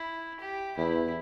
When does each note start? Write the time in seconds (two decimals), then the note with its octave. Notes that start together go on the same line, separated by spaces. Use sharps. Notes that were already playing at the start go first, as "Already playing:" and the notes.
Already playing: E4
0.40 G4
0.77 E2 E4